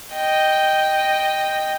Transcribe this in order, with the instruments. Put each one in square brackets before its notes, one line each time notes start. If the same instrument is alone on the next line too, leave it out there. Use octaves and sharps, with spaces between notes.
[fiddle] D#5 G5